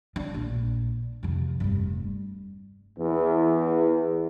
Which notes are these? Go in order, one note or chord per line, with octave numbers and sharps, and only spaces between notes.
D4
A#1
F2 C3
F1 G2
E2